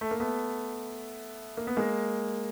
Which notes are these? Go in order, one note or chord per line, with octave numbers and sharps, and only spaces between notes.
A3
A#3
A3 B3
A#3
B3
G#3 A#3